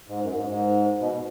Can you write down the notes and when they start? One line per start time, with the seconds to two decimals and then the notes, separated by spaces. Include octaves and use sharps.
0.08 G#2
0.21 F#2
0.35 G#2
0.49 G#2
1.00 B2